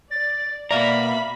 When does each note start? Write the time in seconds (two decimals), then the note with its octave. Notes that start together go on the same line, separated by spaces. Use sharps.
0.11 D5 A6
0.71 B2 A#3 D5 E5 F5 A#5 B5